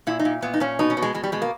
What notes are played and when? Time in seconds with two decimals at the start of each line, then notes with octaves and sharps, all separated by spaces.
0.07 A#2 E4
0.19 D#4
0.25 A#2
0.42 A#2 B3
0.54 D#4
0.60 A#2 C#4
0.79 B2 D#4
0.90 C#4
0.97 B2
1.02 G#3
1.14 B2 G#3
1.24 G3
1.32 B2 G#3
1.42 A#3